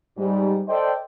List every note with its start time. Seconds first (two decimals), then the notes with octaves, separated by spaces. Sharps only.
0.17 G#2 G3
0.68 A4 C5 D5 D#5 G5